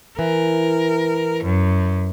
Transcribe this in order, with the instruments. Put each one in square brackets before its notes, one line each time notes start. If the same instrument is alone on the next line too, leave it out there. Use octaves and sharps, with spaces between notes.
[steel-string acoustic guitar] E3 [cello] A#4
[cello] F#2